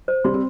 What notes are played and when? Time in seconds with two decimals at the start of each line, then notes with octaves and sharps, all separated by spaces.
0.08 C5
0.24 G3 C6
0.34 C4